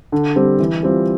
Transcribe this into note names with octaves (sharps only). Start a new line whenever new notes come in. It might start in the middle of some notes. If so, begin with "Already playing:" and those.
D3
G3 C4
E3
G3 C4 F4